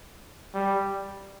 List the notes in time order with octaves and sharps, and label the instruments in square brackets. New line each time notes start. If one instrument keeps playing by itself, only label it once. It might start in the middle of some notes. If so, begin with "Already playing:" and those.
[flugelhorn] G3